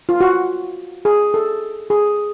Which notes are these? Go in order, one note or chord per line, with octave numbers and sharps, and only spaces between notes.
F4
F#4
G#4
A4
G#4